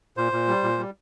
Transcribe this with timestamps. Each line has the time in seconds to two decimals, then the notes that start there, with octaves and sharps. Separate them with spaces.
0.17 A#2 C5
0.32 A#2
0.48 G3
0.63 A#2
0.78 G3